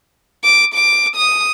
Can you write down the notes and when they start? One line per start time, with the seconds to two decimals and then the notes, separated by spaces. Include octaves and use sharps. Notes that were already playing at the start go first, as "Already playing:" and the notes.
0.44 D6
0.74 D6
1.16 D#6